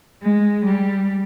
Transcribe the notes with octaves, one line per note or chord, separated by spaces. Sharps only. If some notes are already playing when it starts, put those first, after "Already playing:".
G#3
G3